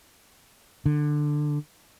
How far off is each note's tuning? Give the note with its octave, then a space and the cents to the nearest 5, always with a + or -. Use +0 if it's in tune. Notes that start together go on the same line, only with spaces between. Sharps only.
D3 +15